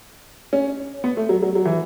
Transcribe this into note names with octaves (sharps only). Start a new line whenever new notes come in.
C#4
B3
A3
F#3
F#3
F#3
E3